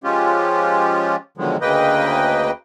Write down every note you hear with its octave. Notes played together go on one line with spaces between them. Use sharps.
F3 G#3 C#4 F4 G4
B2 D3 D#3 F3 F#3 G#3
D2 C#3 A#3 B4 D#5 G5